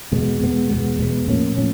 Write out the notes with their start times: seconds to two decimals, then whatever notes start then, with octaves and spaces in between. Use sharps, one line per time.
0.12 E2 B2 G#3 B3
0.41 E2 B2 G#3 B3
0.70 E2 B2 G#3 B3
0.99 E2 B2 G#3 B3
1.28 A2 F3 A#3 C#4
1.57 A2 F3 A#3 C#4